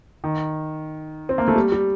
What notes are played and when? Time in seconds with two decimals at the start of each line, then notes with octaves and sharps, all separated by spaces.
0.24 D#3
1.29 C4
1.38 A#3
1.48 A3
1.55 G3
1.72 G3